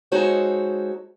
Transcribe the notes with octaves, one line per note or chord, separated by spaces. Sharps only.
G#3 D#4 F#4 A4 C5 C#5